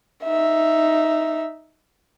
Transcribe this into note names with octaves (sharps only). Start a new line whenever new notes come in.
D#4 E5